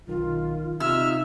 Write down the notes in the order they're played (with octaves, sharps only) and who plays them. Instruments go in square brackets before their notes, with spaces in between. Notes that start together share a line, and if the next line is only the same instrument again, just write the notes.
[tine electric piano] B1 D#3 [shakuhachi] F4
[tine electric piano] C3 F4 [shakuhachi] D#4 [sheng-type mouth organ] E5 F6 [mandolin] E6